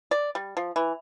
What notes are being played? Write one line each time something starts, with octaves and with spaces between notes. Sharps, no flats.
D5
G3
F3
E3